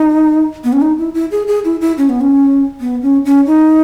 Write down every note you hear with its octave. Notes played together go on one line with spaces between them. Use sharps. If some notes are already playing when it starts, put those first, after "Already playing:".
Already playing: D#4
B3
C#4
D#4
E4
E4
G#4
G#4
E4
E4
C#4
B3
C#4
B3
C#4
C#4
D#4